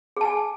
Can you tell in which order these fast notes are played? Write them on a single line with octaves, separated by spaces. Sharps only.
G#4 A5 G#5